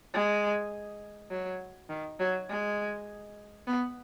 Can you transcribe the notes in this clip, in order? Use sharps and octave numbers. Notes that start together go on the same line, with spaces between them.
G#3
F#3
D#3
F#3
G#3
B3